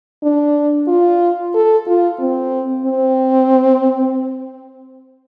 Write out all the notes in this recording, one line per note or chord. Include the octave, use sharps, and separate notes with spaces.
D4
F4
A4
F4
C4
C4